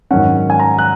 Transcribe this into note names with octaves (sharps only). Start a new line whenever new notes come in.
G#2 D#3 F#3 C#4 F#5
G#5
A#5
F#6